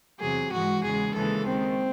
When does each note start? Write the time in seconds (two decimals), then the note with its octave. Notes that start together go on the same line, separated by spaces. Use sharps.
0.20 E2 C3 F#3 G#4
0.51 G#2 E3 G#3 F#4
0.84 E2 C#3 G#3 G#4
1.14 D#2 C#3 E3 G#3 A4
1.47 D#2 D#3 G#3 C4